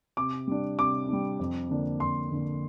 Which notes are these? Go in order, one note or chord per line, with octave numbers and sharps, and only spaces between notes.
C3 D6
G3 D4
C3 D6
G3 D4
F2
D3 A#3 D4
F2 C6
D3 A#3 D4